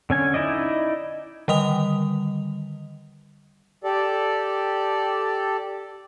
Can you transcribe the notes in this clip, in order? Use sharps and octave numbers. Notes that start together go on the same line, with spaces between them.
D3 C#4 G#5
D#4 E4 D5 D#5
D3 D#3 G3 D#5 D#6 F7
G4 A4 D5